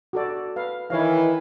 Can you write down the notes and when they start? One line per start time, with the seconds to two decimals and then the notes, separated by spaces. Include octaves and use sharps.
0.13 F#4 A4 D5
0.56 B4 F5
0.90 D#3 E3 B4 C#5 F5